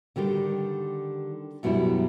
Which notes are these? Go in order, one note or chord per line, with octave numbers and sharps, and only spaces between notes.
D3 D#3 G3 G4
F#2 B2 F#3 G3 E4